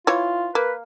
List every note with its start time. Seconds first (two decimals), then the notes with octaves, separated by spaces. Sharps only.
0.07 E3 F4 C#5
0.55 A#3 B4